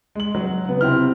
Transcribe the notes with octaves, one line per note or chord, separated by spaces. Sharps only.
G#3 F#7
F#3
C#3 B3
C3 C4 E4 F6